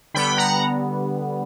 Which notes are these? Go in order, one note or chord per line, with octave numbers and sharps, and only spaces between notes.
D3 G3 B3 G5 B5
F#5 A#5